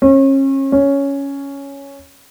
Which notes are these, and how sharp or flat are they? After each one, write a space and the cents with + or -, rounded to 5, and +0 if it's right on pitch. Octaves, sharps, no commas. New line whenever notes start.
C#4 -35
C#4 +5